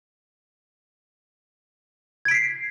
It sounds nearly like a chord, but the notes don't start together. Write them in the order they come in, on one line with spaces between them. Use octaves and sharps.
G#6 D7 B6 C7